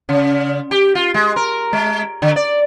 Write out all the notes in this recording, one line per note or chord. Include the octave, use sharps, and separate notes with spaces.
C#3
G4
F4
G#3
A#4
G#3
D3
D5